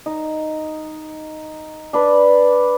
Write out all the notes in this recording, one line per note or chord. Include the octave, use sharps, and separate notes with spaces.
D#4
D4 B4